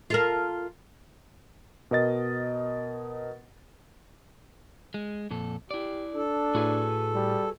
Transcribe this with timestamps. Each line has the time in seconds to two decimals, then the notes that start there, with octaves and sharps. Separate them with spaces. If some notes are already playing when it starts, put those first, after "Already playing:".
0.10 F4 A4 A#4
1.91 B2 A#4 D#5 A6
4.94 G#3
5.31 F2 A#2 A4
5.71 E4 G4 D5
6.14 D4 A4
6.55 A2 F#4 G#4 B4
7.14 G3